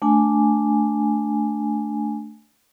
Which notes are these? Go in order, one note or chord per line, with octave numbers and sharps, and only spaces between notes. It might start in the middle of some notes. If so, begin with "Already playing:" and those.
A3 D4 G#5